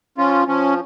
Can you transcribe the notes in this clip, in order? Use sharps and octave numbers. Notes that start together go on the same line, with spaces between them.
F3 C#4 F4
F3 C#4